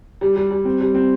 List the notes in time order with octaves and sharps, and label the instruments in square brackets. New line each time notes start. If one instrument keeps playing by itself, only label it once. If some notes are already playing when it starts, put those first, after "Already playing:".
[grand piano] G3
G3
G3
C4
G3
C4